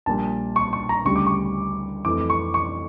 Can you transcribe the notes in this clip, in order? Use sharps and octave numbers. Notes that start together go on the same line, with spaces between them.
A#1 A#2 G3 A5
C#6
C#6
A#5
D2 C#3 G3 C#6
D6
C#6
F2 E3 A3 D6
C#6
C#6